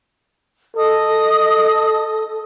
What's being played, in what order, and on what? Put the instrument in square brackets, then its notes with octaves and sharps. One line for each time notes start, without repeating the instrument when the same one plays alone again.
[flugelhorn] A4 [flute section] D#5 D#6